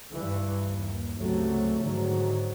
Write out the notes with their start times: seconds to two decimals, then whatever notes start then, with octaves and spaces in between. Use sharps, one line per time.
0.12 G2 E3
0.66 D#2
1.19 C#2 C3 F#3 A3
1.82 G#2 D3 D#3 F#3